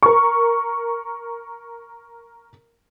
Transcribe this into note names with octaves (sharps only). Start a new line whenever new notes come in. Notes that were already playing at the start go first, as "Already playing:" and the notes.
A#4 C#6